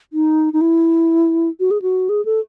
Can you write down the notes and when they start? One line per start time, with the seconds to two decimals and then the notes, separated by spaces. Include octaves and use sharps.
0.13 D#4
0.53 D#4
0.61 E4
1.60 F#4
1.71 G#4
1.82 F#4
2.09 G#4
2.25 A4